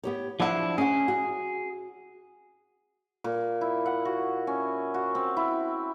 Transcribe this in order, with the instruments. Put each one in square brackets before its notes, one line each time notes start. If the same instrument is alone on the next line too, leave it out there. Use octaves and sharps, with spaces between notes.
[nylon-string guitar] B3 G4 C#5
[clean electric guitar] F3 D4 E4 [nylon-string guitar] F5 F#5
[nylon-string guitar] C#4 F#5 [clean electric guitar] G#4
[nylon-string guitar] F#4
[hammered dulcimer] A#2
E4
F#5
F#4
C#4
F#4
C4
E4